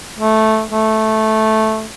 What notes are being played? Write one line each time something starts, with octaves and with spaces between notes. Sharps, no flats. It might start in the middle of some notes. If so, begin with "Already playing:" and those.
A3
A3